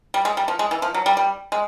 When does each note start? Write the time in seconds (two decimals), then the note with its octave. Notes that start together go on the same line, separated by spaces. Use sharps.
0.14 G3
0.25 G#3
0.37 G3
0.48 F3
0.59 G#3
0.71 E3
0.82 F3
0.94 F#3
1.06 G3
1.17 G3
1.52 G#3